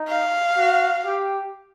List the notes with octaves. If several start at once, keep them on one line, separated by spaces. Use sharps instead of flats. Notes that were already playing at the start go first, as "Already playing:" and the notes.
Already playing: D#4
F5
F#4
G4